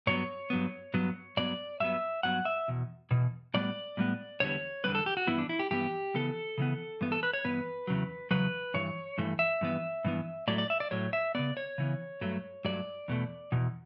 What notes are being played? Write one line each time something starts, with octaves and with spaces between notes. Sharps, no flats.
G2 F#3 B3 C#5
G2 F#3 B3
G2 F#3 B3
G2 F#3 B3 D5
G2 F#3 B3 E5
G2 F#3 B3 F#5
E5
E2 B2
E2 B2
A2 G3 B3 D5
A2 G3 B3
E2 D3 G3 B3 C#5
E2 D3 G3 B3 B4
A4
G4
F#4
G2 E3 B3 E4
D4
E4
G4
G2 E3 B3 G4
C#3 E3 B3 A4
C#3 E3 B3
G2 E3 B3
A4
B4
C#5
G2 E3 B3 B4
E2 C#3 F#3
E2 C#3 F#3 B4
G2 E3 C#5
G2 E3 A3
E5
G2 E3 B3
G2 E3 B3
A2 F#3 A3 D5
D5
E5
D5
A2 F#3 A3 C#5
E5
C#3 E3 B3 D5
C#5
C#3 E3 B3
G2 F#3 A3
G2 F#3 A3 D5
E2 B2 A3
E2 B2